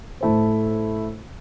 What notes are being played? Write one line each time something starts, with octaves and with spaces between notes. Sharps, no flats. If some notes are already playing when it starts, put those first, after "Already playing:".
A2 A3 E4 A4 C5